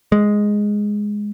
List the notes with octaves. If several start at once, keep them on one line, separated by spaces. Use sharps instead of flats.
G#3